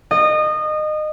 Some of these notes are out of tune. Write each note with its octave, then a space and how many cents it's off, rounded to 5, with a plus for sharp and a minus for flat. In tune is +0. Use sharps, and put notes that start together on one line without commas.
D#5 -25